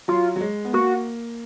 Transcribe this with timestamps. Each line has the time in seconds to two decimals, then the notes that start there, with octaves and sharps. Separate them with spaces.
0.08 F#3 F4
0.36 F#3
0.41 G#3
0.65 B3
0.73 A#3 F#4